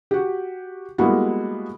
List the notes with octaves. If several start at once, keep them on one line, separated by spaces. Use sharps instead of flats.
F#4 G4
G3 G#3 A#3 B3 E4 F#4